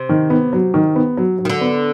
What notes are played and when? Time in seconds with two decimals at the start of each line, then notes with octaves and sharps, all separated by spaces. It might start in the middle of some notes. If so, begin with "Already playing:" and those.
Already playing: C3
0.09 D#3
0.30 B3
0.53 F#3
0.74 D#3
0.96 B3
1.17 F#3
1.39 F#3
1.45 D#3
1.49 D3
1.61 B3